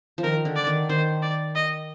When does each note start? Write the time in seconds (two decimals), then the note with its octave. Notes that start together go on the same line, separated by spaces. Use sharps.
0.18 F3
0.23 D#3 A#4
0.45 D3
0.56 D5
0.67 D#3
0.89 D#3 C5
1.22 D5
1.56 D#5